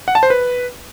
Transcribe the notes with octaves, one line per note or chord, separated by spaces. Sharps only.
F#5
A5
C5
B4